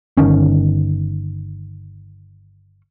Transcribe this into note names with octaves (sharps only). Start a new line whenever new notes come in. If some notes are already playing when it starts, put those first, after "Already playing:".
G1 D#3 C#4